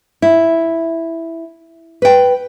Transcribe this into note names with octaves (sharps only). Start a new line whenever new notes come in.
E4
B4 G5